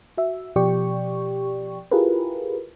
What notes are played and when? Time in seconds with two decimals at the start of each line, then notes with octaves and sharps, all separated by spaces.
0.18 F#4 E5
0.56 B2 F3 G4 D5 G5 C#6
1.91 E4 F4 G4 G#4 A#4 B4